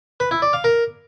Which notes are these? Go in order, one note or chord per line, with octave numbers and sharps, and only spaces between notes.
B4
E4
D5
F5
A#4